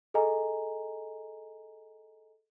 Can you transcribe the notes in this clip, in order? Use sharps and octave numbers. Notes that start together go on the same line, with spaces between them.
G#4 A4 D#5 G#5 A#5